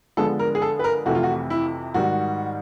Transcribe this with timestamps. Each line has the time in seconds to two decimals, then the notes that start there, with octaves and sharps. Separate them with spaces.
0.17 D3 F3 G#3 B3 A4
0.39 A#4
0.55 G#4
0.62 A4
0.79 B4
0.84 A#4
1.05 F2 C3 E3 A3 F#4
1.15 F4
1.23 F#4
1.50 E4
1.94 G#2 D#3 G3 F#4